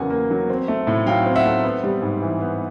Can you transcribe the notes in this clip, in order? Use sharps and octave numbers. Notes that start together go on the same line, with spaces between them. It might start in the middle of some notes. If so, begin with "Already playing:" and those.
Already playing: E2 C#3 F#3 A#3 F#5 G#5
A#3
F#3
C4
A3
A2
F#3 F5 G5
C4
E5 F#5
A3
B3
G3
G#2
E3
B3